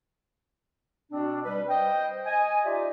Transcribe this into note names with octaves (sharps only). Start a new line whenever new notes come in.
B2 C4 D4
G3 B4
C5 D#5 G5
D#5 G#5
D#4 F4 G4 D5 E5